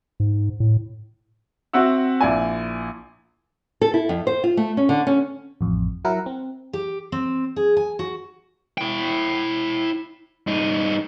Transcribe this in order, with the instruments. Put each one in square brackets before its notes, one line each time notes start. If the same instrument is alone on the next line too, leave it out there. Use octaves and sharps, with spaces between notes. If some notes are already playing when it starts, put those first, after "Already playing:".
[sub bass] G#2
A2
[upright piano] C4 F#4 E5 F#5 E6
A#1 E4 D5 G#5
[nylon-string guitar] A4
E4
F2
C5
F4
A3
C#4
D3
C#4
[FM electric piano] A1 F2
F#3 E4 A#4 F#5
C4
[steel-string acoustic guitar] G4
C4
G#4
G#5
F#4
[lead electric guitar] E4 G5
G2 D#4